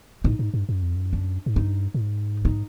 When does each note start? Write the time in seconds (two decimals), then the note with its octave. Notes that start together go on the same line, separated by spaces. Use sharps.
0.24 A2 D#4
0.39 G#2
0.54 G2
0.69 F#2
0.82 F2
0.96 F#2
1.13 D4
1.46 G#2
1.56 G2 D#4
1.94 A2
2.01 G#2
2.45 D#4